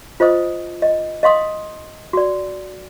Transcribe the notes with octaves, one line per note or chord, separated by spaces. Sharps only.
F4 C5 D#5 D#6
D#5
D#5 F5 C6 D#6
F#4 D5